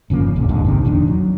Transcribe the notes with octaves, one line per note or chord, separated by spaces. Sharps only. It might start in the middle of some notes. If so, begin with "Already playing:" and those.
G1 C#3 F3 A#3
F#1 D2 A#2 C#3
G#1 D#2 G#2 D3
A#1 C3 D#3
F1 D#2 D#3 D4
F#3